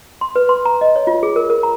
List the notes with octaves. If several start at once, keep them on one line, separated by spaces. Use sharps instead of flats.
C6
B4
C6
A#5
D#5
C#5
F4
G#4
A#4
A#4
A#5